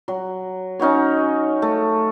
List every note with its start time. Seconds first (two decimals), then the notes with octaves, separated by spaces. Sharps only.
0.08 F#3
0.79 C#4 D#4 F#4 C#5
1.62 A3